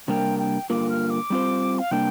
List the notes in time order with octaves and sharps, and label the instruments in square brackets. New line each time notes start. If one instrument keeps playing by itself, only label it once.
[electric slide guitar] C3 G3 A#3 D4 A#4 [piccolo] G5
[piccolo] G5
[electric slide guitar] G2 D3 A#3 F4 A#4 [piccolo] D6
[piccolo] F6
D6
[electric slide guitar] G3 C4 F4 C5
[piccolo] F5
[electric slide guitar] C3 G3 A#3 D4 [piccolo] G5